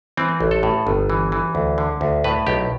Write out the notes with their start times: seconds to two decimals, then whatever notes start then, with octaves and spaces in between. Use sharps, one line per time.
0.17 E3 C4
0.41 A1
0.51 A4
0.63 A2
0.87 G1
1.10 E3
1.32 E3
1.55 D2
1.78 D3
2.01 D2
2.24 A2 B4
2.47 B1 G4